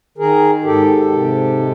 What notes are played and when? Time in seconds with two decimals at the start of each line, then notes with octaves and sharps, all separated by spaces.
0.18 D#3 G#4 A#4
0.64 G#2 G4 A4
1.11 C3
1.57 G#3